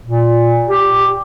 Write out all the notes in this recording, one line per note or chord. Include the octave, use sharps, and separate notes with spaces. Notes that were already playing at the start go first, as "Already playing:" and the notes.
A#2
G4